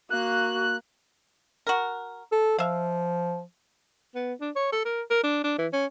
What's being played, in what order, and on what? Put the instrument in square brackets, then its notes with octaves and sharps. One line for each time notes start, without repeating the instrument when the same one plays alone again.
[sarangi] A#3 [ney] F#4 [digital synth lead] F#6
[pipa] F#4 A#4
[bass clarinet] A4
[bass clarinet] F3 [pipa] E5 F5
[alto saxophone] B3
D4
C#5
A4
A#4
A#4
D4
D4
E3
C#4